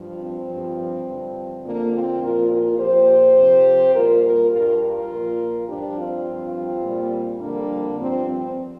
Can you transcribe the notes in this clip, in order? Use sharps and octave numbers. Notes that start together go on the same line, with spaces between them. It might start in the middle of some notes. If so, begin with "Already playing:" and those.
Already playing: G2 F3
C4
G2 F3
G2 D3 F3
F2 D3 F3 A#3 D4
C4 F4
A#2 F3 F4 A#4
F4 A#4
A#2 F3 G4 C5
F2 C3 F3
A#2 G3 F4 A#4
F4 A#4
G2 G3 F4 A#4
F4 A#4
A#2 F3
G2 F3 D4 G4
C4 F4
F3
G2
A#2 G3
F2 D3 G3 A#3 D4
G2 F3 C4
C4